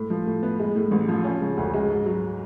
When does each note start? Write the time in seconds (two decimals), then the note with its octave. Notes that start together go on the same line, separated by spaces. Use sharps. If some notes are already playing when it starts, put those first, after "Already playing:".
Already playing: A2
0.10 F3
0.26 A2
0.43 B3
0.59 G#3
0.75 A2
0.91 A1
1.08 F3
1.24 C#4
1.41 C#3
1.57 D2
1.74 G#3
1.90 G#2
2.06 F#3